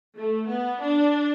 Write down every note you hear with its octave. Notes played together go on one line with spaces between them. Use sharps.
A3
B3
D4